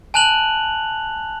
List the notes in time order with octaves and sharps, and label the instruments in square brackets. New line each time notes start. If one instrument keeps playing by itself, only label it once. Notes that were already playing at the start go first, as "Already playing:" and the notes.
[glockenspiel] G#5 A5 F#6 F7 F#7